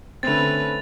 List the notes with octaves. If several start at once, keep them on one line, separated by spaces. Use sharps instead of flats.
D3 A3 C4 C#4 B4 A6 F7